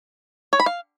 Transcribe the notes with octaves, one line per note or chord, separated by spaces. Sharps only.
C#5
B5
F5